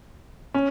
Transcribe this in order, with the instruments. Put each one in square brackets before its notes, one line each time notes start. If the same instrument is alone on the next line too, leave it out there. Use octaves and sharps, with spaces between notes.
[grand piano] C#4